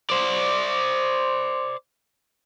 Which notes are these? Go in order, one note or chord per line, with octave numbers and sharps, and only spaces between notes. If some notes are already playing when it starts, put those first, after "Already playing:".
C5 D5